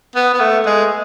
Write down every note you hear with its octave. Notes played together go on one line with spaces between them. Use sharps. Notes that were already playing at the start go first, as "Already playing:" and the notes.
B3
B3
A3
G#3